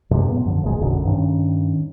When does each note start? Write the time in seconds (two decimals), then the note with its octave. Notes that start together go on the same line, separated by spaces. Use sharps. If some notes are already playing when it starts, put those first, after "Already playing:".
0.11 F#2 A2 C3 G#3
0.28 A#2 B3
0.45 F#2 D3 F3
0.63 E1 D2 A#2 G#3
0.81 A#1 F#2 B2 D3
1.05 G2 D#3 C#4